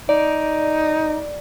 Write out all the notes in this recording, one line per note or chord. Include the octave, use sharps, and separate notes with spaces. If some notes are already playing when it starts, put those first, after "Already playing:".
D#4 D5